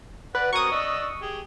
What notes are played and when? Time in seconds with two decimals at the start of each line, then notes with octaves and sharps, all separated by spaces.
0.35 B4 D5 F#5
0.53 F#3 C4 A#4 C#6 D#6
0.72 D4 D#5 E6
1.22 G4 G#4